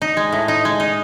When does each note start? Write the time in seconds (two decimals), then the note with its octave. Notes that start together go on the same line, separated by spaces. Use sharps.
0.02 D#4
0.17 G#3
0.33 A2
0.48 D#4
0.65 G#3
0.80 D#4